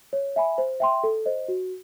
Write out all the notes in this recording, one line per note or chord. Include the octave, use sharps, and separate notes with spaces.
C#5
E5 G#5 B5
C5
E5 G5 C6
A4
C5 D#5
F#4